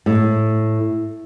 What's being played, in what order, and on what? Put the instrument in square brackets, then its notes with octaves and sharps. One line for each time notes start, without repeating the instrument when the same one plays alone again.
[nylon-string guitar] A2